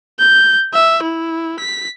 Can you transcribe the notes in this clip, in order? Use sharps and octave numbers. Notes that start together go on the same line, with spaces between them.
G6
E5
E4
B6